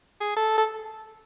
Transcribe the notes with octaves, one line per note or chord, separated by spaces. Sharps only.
G#4
A4
A4